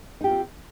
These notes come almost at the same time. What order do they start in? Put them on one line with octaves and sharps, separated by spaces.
D#4 G4 F4 C4